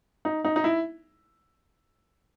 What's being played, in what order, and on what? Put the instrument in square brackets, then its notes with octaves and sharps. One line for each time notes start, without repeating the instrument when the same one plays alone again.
[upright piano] D#4
D#4
D#4
E4